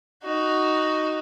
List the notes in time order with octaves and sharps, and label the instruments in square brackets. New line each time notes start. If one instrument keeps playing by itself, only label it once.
[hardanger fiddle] D#4 F#4